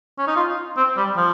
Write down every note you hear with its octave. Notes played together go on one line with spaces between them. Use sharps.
C#4
D#4
F4
C4
G3
F3